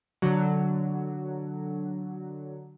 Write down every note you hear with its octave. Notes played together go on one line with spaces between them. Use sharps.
D3 F#3